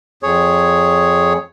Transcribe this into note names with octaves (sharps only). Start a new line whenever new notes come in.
F2 G#4 C#5